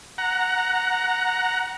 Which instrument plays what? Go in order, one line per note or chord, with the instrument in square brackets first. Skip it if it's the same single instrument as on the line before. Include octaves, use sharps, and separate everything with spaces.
[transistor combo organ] F#5 A#5